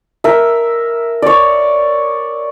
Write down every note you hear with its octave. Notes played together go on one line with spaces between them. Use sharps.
A#4 E5
C#5 D5